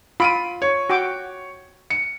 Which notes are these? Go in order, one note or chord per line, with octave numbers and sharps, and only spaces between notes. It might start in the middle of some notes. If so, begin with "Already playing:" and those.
F4 B5 D7 D#7
C#5
F#4 G5 D6
C#7